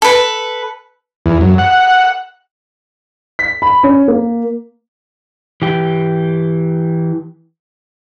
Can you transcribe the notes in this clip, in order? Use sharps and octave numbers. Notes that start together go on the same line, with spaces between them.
A4 B4
E2
F#2
F#5
B6
B5
C#4
A#3
E3 G4